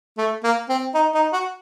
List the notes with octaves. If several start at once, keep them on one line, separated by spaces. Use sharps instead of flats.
A3
A#3
C4
D#4
D#4
F#4